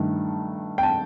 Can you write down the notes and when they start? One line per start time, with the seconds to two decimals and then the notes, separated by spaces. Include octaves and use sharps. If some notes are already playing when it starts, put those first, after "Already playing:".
Already playing: G2 D#3 A3
0.78 G5
0.83 A5